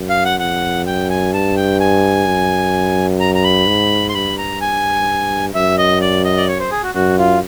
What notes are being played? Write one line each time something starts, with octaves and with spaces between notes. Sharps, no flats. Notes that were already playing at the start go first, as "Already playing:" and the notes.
Already playing: F#2
F5
F#5
F2 F#5
F#2 G5
G#5
G2 A5
G5
G#5
F#2
A#5
A#5
B5
G#2
C6
G2 B5
A#5
G#5
F#2 E5
D#5
D5
D#5
D5
C#5
C5
G#4
F#4
F#2 F#4
F4